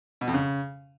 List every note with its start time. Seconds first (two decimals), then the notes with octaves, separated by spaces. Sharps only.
0.21 B2
0.28 F2
0.34 C#3